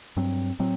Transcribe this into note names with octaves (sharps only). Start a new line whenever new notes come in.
G2 F#3 C4
A2 F#3 C4